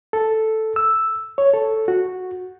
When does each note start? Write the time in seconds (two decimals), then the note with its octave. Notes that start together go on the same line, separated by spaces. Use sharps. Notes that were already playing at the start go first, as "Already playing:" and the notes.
0.13 A4
0.76 E6
1.38 C#5
1.54 A4
1.88 F#4